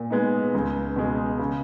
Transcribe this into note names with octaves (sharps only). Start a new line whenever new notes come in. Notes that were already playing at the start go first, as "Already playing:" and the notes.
Already playing: A#2
G#3 B3 D#4
C#2
B2 G#3
C#3